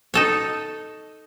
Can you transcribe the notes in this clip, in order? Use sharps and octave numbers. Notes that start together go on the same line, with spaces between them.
D#4 A4 C#5